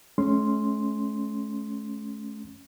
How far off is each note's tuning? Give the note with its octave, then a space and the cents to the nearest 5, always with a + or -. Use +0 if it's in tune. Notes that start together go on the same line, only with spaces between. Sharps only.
A3 -45 C#4 +0 C6 +0